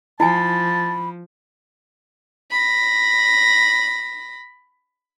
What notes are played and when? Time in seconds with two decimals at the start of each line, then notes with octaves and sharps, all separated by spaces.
0.20 F3 E4 G#5 A5 B5
2.51 B5 A#6